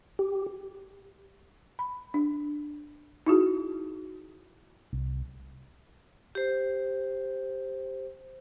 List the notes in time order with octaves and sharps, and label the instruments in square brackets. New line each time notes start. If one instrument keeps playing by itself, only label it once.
[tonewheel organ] G4
[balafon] B5
D4
D#4 E4 F#4 G#4
[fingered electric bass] C2
[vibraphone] G4 C5